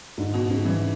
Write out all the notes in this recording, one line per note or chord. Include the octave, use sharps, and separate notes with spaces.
G#2 D3
B2
G#2 C#3
E3